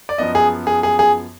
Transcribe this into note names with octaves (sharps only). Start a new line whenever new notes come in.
D5
F#2 F3 B3 D#5
G#4
G#4
G#4
G#4